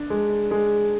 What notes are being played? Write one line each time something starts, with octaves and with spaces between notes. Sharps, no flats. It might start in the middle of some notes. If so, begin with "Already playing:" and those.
Already playing: D4
G#3
G#3